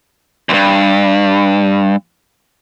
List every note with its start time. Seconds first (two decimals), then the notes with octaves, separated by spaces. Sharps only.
0.49 D2 G2